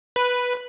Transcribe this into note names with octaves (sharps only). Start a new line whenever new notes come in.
B4